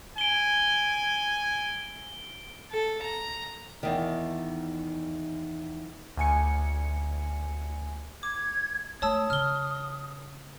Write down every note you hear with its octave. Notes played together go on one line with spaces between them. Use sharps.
G#5 D7 G7
A4
A#5
E2 D#3
D2 G#5 C#7
D6 G#6
A3 C#5 A5 D#6 E6
C#3 F6 G7